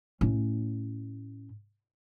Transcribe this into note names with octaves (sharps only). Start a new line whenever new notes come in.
A2 C#4